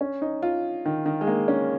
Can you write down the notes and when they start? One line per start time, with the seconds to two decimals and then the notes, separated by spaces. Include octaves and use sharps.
0.01 C#4
0.22 D#4
0.43 F4
0.85 D#3
1.06 D#3
1.21 G#3
1.27 A#3
1.48 C#4